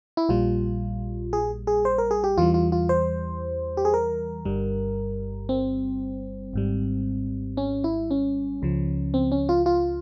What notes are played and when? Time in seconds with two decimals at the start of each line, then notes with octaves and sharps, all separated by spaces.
0.17 E4
0.29 A#1 A#2 G3 F4
1.33 G#4
1.67 G#4
1.85 C5
1.98 A#4
2.11 G#4
2.24 G4
2.37 E2 E3 G3 F4
2.54 F4
2.72 F4
2.89 C5
3.77 G4
3.85 G#4
3.94 A#4
4.45 G1 G2 G3
5.49 C4
6.53 G#1 G#2 G3
7.57 C#4
7.84 E4
8.11 C#4
8.62 C#2 C#3 F3
9.14 C4
9.32 C#4
9.49 F4
9.66 F4